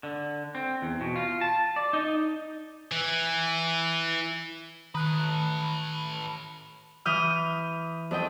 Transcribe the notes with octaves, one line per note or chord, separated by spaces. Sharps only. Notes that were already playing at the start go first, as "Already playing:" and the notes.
D3
C4
E2
B2
F4
A5
D5
D#4
E3
D#3 A4 B4 F#6
E3 D#6 F6 G6
F2 D#5 G5